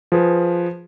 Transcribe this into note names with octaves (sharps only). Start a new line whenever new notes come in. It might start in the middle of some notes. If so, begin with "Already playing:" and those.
F3 G#4 B4